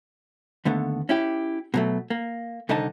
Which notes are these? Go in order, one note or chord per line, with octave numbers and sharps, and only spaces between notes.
D#2 D3 A3 B3
C#4 E4 G4
B2 F#3 A3
A#3
C2 D3 D#3 D#4 D#5 A5